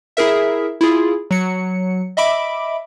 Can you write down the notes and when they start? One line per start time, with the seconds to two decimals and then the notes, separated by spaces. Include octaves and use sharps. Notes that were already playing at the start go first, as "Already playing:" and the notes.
0.17 E4 G#4 A#4 E5
0.81 E4 F4 G#4
1.31 F#3 C#7
2.17 D#5 E5 B5 D6 D7